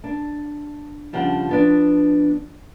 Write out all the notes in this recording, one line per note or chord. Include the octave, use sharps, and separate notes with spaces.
D4
C#3 F3 G3 D4 F#5
F3 B3 D4